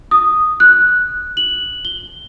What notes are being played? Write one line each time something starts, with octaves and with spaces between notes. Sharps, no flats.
D#6
F#6
F#7
G7